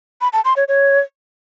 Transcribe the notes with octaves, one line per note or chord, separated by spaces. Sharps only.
B5
A5
C6
C#5
C#5